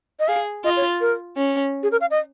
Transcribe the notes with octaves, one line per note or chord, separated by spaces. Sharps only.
D#5
G#4 F5
F4 D#5
C#5
A#4
C#4
G#4
A#4
F5
D#5